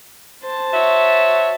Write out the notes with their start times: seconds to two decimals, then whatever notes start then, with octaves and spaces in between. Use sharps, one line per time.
0.43 C5 A5
0.73 F#4 C#5 E5